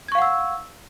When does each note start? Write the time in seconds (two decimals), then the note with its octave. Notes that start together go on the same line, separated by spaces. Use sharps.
0.08 G#6
0.12 C#6
0.15 F5
0.18 F#5
0.22 E6